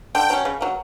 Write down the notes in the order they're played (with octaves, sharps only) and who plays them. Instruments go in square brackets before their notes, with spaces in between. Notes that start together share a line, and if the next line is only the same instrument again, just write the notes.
[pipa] D3 [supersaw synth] G5
[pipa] F#3 C#4
C#3
F#3 A#3